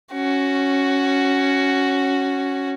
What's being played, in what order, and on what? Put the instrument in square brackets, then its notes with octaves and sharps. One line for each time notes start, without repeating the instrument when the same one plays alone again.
[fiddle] C#4 F#4